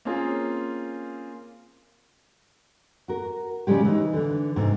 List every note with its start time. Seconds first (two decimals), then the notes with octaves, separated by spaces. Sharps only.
0.05 A#3 C4 C#4 F4 G#4
3.08 F#4 A#4
3.67 C#3 F3 G3 G#3 G4
3.85 E3 D#4
4.13 D3 E3
4.56 G#2 C3